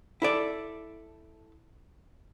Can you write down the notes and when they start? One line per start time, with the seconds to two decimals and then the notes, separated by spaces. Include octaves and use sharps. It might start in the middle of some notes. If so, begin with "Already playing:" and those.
0.22 E4 A4 D5